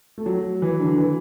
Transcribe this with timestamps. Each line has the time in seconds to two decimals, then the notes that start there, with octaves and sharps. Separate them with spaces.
0.18 A3
0.26 F#3
0.62 E3
0.80 D3
0.98 E3